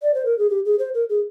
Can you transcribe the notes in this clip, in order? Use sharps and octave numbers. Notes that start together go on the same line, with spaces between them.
D5
C5
A#4
G#4
G4
G#4
C5
A#4
G#4